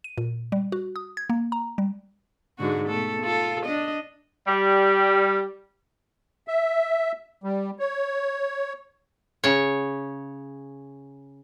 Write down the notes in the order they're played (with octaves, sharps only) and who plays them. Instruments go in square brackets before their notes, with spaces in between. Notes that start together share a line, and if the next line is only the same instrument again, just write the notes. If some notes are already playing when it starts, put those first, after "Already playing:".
[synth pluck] D#7
A#2
G3
F#4
D#6
G#6
A#3
A#5
G3
[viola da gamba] G#2 D3 F#4
B2 A3 A4
F4 A4
D4 D#5
[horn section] G3
[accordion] E5
G3
C#5
[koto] C#3 C#5